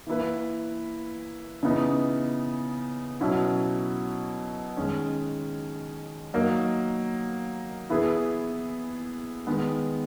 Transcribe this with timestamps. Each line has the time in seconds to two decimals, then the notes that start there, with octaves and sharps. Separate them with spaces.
0.07 E3 A#3 E4 B4
1.63 C#3 E3 B3 D#4
3.20 B2 F#3 C#4 E4
4.77 D#3 G#3 C#4
6.34 F#3 A#3 D#4
7.90 E3 B3 E4 G#4 B4
9.47 D#3 G#3 B3